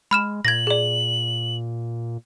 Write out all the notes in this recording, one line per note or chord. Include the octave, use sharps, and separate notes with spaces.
G#3 B5 F6 E7
A#2 G#6 A#6 F#7
G#4 D5